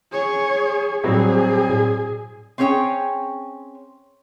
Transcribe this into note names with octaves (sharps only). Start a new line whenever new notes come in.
G#4 C#5
A2 F#3 G3 C4 G#4
A2
C4 C#4 G#4 C#5 G5